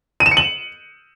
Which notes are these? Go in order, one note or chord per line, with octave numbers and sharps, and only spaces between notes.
D#7
E7
C#7
F#7